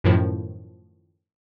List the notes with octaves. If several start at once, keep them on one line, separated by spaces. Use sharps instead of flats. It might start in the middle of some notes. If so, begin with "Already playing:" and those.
F#2 A2 D#3 F3